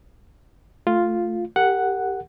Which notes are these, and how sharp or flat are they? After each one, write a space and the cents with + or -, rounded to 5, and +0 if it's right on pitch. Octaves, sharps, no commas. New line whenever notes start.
A3 +0 F4 +0
G4 +0 A#4 -35 F#5 +0